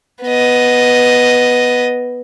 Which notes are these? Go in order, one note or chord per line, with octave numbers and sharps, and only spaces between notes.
B3 D#5